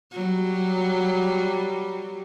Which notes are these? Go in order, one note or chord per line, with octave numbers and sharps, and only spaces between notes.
F#3 G3